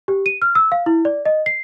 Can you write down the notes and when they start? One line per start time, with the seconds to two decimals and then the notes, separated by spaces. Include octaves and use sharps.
0.08 G4
0.26 D#7
0.42 F6
0.55 E6
0.72 F5
0.86 E4
1.05 D5
1.25 D#5
1.46 C7